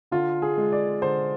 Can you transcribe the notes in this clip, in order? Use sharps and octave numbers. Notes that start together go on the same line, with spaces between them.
D3 F4
G#4
G#3
D5
D3 C5